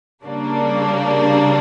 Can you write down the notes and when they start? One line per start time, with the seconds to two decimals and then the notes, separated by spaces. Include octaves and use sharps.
0.24 C#3 G3 A#3 D4